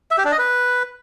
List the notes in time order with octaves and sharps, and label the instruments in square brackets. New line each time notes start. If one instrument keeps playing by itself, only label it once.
[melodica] E5
G4
D4
D#5
B4